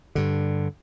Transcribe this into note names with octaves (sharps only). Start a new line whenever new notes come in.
G2 D3